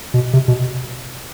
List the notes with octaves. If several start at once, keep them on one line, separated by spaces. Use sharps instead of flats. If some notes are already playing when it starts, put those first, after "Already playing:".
B2
C3
B2